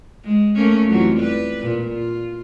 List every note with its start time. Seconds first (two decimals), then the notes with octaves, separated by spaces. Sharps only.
0.24 G#3
0.55 A3 A#3 C#4
0.86 F2 E3 F#3
1.16 G3 B4
1.61 A#2
1.93 F4